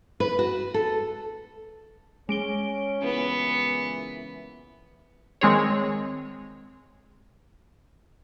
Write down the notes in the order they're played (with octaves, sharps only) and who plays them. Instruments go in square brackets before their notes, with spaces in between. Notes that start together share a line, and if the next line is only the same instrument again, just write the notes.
[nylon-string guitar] B4
F#4
A4
[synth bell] G#3 D7 G7 [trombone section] C#4
[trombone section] A#2 C#3 E3 [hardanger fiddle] B3
[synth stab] D#3 G#3 C4 G#4 C#5